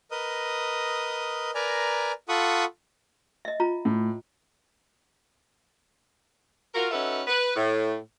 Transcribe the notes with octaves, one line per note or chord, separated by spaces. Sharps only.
A#4 B4 D#5 D#6
A#4 B4 D5 G#5 A#5
F4 A4 F#5 B5 C#6 D#6
D#5 E5
F4 A#5
A2
F4 F#4 A#4
C#4 D#4 F#4 A4 B4 E5
B4
A2